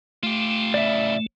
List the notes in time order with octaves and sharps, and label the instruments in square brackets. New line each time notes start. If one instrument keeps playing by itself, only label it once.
[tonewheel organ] A3 [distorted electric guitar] F4 G4
[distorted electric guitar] A2 C#3 [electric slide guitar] D5 E5